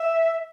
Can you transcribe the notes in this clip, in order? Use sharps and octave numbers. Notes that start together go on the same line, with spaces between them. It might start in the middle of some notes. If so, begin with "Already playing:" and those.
Already playing: E5